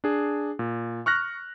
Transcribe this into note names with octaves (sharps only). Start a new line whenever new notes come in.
D4 G#4
A#2
C#6 F6 F#6 A#6